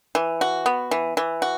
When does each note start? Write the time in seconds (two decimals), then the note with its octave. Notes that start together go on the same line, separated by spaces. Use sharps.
0.15 E3
0.41 F#4
0.66 B3
0.91 E3
1.17 E3
1.42 F#4